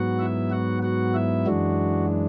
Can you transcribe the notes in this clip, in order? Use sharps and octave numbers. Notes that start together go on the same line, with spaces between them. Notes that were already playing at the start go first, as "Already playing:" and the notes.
Already playing: G#2 F#3 B3 F#4 F#5
E4 E5
F#4 F#5
F#4 F#5
E4 E5
F#2 E3 G#3 D4 F#4